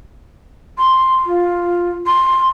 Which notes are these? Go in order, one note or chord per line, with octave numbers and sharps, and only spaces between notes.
C6
F4
C6